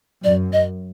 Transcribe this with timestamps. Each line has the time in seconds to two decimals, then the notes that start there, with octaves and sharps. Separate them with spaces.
0.24 F#2 D5
0.53 D#5